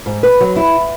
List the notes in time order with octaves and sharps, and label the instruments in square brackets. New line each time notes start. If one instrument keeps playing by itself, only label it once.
[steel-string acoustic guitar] G#2
B4
F#3
E4